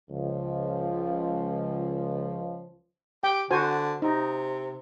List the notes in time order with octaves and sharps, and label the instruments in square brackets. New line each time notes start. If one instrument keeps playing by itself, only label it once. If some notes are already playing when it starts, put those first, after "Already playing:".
[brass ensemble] C#2 F3
[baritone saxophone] G4 [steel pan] G5
[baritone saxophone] D3 [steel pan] F#4 C5 G#5
[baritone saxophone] C3 [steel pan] D#4